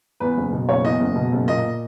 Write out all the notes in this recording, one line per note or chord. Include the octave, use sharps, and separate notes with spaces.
E2 B4
F#1
B2
F#1 C#5
E2 D#5
F#1
B2
F#1
A#2 D#5